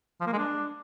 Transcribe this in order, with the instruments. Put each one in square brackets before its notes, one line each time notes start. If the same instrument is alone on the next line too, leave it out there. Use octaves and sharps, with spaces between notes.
[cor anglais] F3
A#3
G#3
D4